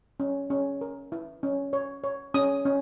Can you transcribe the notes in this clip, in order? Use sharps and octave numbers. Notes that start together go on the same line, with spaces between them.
C#4
C#4
A#4
E4
C#4
C#5
C#5
C#4 D#6
C#4